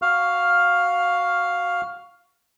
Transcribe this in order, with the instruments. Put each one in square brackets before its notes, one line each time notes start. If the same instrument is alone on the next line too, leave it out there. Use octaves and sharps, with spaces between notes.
[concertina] F#4 F5 F6